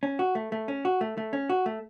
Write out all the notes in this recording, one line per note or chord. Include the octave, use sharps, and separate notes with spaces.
C#4
F#4
A3
A3
C#4
F#4
A3
A3
C#4
F#4
A3